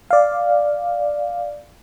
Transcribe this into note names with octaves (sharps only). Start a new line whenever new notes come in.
D5 F5